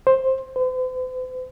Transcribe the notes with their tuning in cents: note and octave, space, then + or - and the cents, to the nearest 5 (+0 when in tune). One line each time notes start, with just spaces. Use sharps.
C5 +10
C5 -45